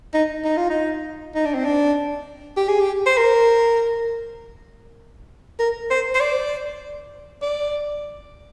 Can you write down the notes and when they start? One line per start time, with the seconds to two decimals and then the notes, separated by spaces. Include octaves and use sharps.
0.14 D#4
0.44 D#4
0.57 F4
0.70 D#4
1.35 D#4
1.45 D4
1.55 C4
1.65 D4
2.57 G4
2.68 G#4
2.80 G4
3.06 C5
3.17 A#4
5.59 A#4
5.91 C5
6.15 C5
6.20 D5
7.42 D5